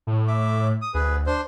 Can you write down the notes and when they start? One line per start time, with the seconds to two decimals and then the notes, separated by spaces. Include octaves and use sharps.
0.07 A2
0.28 E5 D6
0.82 D#6
0.94 D2 G#4 B4
1.27 D4 C5